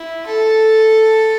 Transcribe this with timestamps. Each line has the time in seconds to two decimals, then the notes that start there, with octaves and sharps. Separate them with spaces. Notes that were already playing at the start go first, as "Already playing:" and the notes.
Already playing: E4
0.26 A4